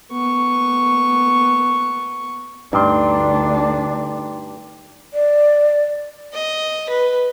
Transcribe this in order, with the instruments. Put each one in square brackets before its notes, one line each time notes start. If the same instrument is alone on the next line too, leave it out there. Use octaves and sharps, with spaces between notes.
[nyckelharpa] B3 C#6
[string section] D2 [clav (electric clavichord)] G2 [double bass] D4 [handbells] D#4 G5 C6
[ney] D5
[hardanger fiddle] D#5
B4